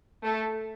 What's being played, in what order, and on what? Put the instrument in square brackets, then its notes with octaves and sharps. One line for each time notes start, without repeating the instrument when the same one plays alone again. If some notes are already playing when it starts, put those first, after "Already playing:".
[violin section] A3 A4